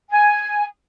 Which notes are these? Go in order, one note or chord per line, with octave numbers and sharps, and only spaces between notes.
G#5